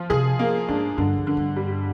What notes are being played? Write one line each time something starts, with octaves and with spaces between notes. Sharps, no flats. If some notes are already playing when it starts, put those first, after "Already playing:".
Already playing: F3
C3 G#4
A#3
G#2 D4
G2 D3
F2
D3
G2
G3